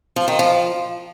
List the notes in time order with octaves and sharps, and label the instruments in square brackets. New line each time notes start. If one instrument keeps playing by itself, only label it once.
[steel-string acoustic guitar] F3
D#3
F3